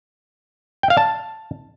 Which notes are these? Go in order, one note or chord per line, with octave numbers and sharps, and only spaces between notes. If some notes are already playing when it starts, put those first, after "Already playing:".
G5
F5
A5